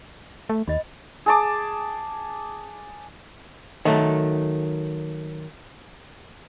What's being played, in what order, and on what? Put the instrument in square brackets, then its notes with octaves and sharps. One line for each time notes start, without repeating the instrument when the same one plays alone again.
[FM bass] A3
[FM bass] D#2 [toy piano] D#5 B5
[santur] G#4 A5 D6
[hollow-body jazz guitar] D#3 F#3 A3